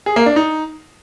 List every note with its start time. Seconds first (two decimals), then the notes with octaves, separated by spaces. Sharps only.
0.06 G#4
0.16 A#3
0.26 D4
0.36 D#4